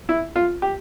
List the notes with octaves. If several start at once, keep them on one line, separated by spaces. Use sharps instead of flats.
E4
F4
G4